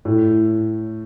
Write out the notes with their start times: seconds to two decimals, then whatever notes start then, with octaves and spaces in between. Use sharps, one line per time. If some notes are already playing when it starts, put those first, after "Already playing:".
0.05 A2